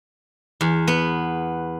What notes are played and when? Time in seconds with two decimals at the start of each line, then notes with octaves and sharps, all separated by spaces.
0.61 E2
0.88 B3